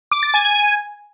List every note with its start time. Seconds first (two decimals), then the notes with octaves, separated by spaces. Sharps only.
0.12 D6
0.23 A6
0.34 G#5
0.45 G#5